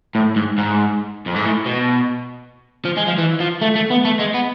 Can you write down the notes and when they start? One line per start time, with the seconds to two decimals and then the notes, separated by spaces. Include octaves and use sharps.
0.15 A2
0.36 G#2
0.58 G#2
1.27 F2
1.36 G#2
1.44 A2
1.66 B2
2.85 F3
2.97 G#3
3.07 F3
3.18 E3
3.40 F3
3.61 A3
3.75 A3
3.90 B3
4.05 A3
4.19 G#3
4.34 B3